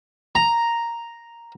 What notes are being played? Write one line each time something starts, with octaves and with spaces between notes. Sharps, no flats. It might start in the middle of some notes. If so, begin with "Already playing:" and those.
A#5